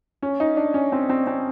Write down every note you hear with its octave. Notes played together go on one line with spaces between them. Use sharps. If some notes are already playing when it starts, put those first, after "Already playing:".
C#4
D#4
D4
C#4
C4
C4
C4